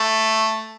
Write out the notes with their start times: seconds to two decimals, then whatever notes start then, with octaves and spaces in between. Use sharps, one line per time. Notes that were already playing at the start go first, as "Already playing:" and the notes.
Already playing: A3